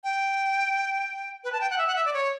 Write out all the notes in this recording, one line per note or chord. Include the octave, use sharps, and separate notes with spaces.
G5
B4
A5
G5
F#5
E5
F#5
E5
D5
C#5